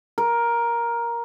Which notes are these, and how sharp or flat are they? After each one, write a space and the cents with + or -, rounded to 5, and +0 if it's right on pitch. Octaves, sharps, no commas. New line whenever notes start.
A#4 +10